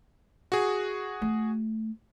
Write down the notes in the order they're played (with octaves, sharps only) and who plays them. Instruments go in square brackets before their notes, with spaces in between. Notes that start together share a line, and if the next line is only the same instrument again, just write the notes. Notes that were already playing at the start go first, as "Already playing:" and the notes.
[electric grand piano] F#4 G#4
[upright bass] A3